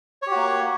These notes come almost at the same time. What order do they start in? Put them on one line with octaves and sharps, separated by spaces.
C#5 G4 F#4 A#3